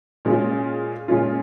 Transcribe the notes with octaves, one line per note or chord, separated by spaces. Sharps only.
A#2 G#3 C#4 F4
A#2 G#3 C#4 F4